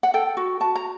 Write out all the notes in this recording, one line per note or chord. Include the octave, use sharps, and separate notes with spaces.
F#5
A4 G5
F#4
F#4 A5
A#5